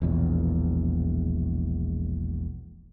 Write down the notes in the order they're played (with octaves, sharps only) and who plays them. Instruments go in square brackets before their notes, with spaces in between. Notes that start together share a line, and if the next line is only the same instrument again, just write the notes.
[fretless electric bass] E1 A#1 E2